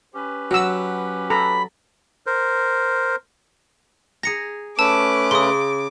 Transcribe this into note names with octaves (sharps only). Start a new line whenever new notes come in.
C#4 G4 B4
F#3 F#4 E6
A4 A#5 B5
A#4 C5
G#4 A#5 A#6 C#7
A3 C#4 B4 A5 D6 E6
C#3 C6 D#6